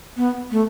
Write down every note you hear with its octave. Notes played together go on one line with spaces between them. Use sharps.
B3
A3